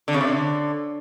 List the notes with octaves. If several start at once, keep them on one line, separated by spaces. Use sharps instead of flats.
D3
C#3
C3
D3